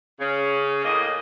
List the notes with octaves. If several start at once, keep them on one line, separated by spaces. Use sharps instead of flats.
C#3 C#4
A2 A#3 D#5